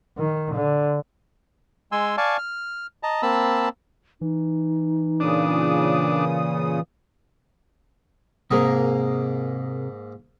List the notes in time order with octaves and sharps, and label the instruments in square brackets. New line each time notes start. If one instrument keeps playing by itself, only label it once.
[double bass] D#3
D3
[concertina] G#3 G#5 C6 E6
D5 F5 G#5 A5 C#6
F6
D#5 A5 A#5
A#3 C4 A5 B5 E6
[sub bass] E3 [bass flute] D#4
[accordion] A#2 C#3 D#6 [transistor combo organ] D4
[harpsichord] G#2 A#3 D#5 [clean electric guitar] C3 G#4 A#4